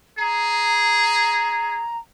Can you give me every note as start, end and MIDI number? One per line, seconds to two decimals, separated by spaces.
0.18 1.79 68
0.18 1.97 82